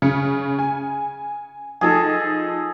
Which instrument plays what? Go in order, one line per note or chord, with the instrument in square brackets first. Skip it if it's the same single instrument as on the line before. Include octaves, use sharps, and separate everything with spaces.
[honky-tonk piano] C#3 C#7
G#5
[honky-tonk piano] F3 D#4 [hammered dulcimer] G#4 A4